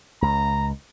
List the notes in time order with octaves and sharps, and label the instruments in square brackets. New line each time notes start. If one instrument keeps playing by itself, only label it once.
[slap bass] C#2 [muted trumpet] A#5